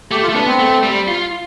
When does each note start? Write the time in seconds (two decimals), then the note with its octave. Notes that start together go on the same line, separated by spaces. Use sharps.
0.11 A3 G4
0.23 F4
0.29 A3
0.35 B3 D4
0.47 C4
0.59 A3
0.83 G3
1.08 F4